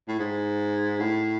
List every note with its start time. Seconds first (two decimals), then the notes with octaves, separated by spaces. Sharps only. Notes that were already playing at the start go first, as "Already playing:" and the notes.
0.08 A2
0.19 G#2
1.00 A2